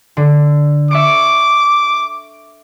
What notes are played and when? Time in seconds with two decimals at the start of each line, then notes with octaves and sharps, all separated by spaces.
0.17 D3
0.91 E5 C#6 D6 D7